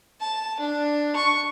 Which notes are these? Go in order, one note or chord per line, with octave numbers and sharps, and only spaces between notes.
A5
D4
C#6